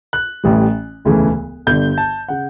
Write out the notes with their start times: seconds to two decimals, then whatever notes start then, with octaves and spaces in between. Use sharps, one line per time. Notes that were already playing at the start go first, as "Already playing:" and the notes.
0.13 F#6
0.44 A1 A2 E3 G3
1.05 E1 D2 C#3 E3 A3
1.67 G1 G2 D3 G6
1.98 A5
2.28 C#3 F#5